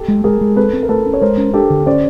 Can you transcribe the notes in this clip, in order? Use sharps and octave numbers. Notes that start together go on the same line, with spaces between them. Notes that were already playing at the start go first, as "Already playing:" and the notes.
Already playing: G4 A4
G#3
G#3 G#4 A#4
G#3
C4 A4 B4
C4
A#4
A3 A4 B4
C#4
C#5
G#3 A#4 C5
C#4
D4 G4 A4
D3
C#4 C5 D5